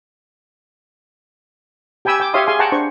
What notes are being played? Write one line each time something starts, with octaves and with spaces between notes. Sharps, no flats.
G4 G5 G#5 B5 E6
G5 D6
G4 C#5 E5 F5 C6 D#6
G#4 F5 G#5 C6
F#5 G5 A5 A#5 C#6
D4 C5 C#6